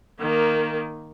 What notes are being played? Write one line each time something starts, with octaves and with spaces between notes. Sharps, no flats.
D#3 A#3